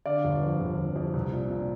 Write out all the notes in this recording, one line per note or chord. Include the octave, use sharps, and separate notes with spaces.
D3 D5 F5
G1
F2
G1
G1
F2
C2
A#2
A#2